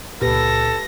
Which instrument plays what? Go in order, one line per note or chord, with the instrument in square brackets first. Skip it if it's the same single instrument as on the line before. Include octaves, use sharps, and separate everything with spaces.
[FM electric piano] C#2 A#2 [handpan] G4 B4 [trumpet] A4 [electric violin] A#6